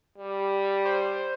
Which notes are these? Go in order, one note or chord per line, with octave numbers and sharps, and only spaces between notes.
G3
C5